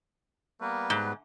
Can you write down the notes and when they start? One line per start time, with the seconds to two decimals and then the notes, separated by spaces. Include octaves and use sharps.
0.61 G3 A#3 B3 B4
0.90 G#2